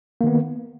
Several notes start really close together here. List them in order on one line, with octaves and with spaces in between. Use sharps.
A#3 D#3 B3